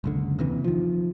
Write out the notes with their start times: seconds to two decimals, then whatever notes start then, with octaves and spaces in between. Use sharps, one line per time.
0.04 F#1 C#2 D3
0.39 D#2 C3 E3
0.64 D#3 F3